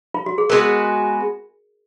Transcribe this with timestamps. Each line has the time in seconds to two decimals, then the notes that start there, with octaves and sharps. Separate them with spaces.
0.14 F4
0.26 F#4
0.38 G#4
0.50 G#3 B3 F#4 A#4 B4